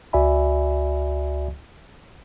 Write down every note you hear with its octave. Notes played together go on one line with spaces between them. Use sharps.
C#2 F#4 D5 E5 G#5 B5